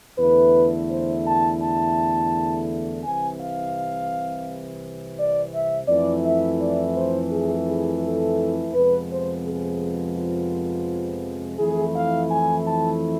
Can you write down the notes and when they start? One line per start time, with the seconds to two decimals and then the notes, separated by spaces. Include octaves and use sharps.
0.19 E2 D3 A3 E4 B4
0.90 C5
1.26 A5
1.61 A5
3.04 C2 C3 E3 G#5
3.39 F5
5.17 D5
5.53 E5
5.88 F2 E3 A3 E4 D5
6.24 E5
6.60 D5
6.95 C5
7.31 G#4
7.67 G#4
8.03 A4
8.73 F2 C3 F3 G#3 B3 B4
9.09 C5
9.44 G#4
10.16 F4
11.58 F2 E3 A3 E4 G#4
11.94 F5
12.30 G#5
12.65 A5